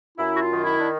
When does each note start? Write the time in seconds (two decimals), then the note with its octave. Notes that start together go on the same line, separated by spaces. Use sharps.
0.18 F#2 E4
0.37 F#4
0.41 F4
0.53 D#3
0.64 E4
0.80 D4